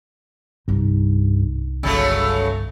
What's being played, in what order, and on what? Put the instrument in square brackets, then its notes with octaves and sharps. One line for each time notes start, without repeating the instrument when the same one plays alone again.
[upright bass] C2 D#4 [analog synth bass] G2
[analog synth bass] G1 [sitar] C#3 F#3 A3